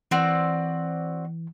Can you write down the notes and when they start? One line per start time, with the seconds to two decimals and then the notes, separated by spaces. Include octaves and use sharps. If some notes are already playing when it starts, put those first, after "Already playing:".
0.11 E3 C4 F#4 D5